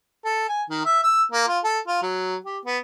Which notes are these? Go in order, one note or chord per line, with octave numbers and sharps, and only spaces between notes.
A4
G#5
D#3
E5
E6
A#3
F4
A4
F4
F#3
G4
B3